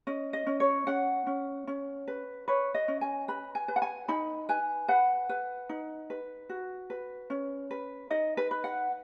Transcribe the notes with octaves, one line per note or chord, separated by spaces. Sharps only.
C#4 D#5
D#5
C#4
C#5
C#4 F#5
C#4
C#4
B4
B4 C#5
D#5
C#4
G#5
B4 B5
G#5
B4
F#5
G#5
D#4 B5
B4 G#5
B4 F#5
B4
D#4
B4
F#4
B4
C#4
B4
D#4 D#5
B4
B4
F#5